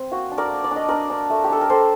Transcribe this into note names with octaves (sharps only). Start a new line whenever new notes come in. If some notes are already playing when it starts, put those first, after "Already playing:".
Already playing: C4
A#3 F#4
D4
A#4 D5
A#3
D5
D4
D#5
D4 A#4 D5
D4
A3
G4
D4 A4
A#4
G3 A4 C5